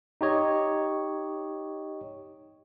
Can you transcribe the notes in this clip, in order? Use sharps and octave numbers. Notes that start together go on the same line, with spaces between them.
D#4 G4 C#5 D#5